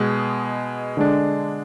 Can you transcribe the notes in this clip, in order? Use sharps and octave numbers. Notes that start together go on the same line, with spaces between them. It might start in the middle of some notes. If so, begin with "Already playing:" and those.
Already playing: B2 G#3 B3
D3 G#3 D4